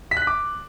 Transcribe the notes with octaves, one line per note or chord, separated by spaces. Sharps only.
B6
F#6
B6
D6